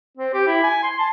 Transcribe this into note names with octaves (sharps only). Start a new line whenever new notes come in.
C4
G4
E4
G#5
C6
A5